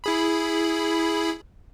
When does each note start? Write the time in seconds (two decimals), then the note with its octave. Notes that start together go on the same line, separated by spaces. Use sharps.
0.04 E4 G#4 B5